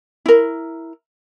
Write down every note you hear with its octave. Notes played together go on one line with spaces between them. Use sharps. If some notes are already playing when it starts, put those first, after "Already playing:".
E4 A#4